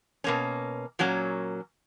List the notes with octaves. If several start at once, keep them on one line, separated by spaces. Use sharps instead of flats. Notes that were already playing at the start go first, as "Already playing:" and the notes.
B2 A#3 C#4
A#2 F#3 A#3 C#4